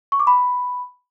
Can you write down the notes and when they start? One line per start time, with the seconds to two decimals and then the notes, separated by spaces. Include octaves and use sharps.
0.12 C#6
0.20 D6
0.27 B5